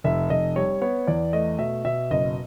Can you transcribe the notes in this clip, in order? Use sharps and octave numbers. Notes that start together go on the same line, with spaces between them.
F1 E5
F1 D#5
G3 C#5
B3 C#5
E2 D5
A3 D#5
B2 E5
B2 E5
F#1 D#5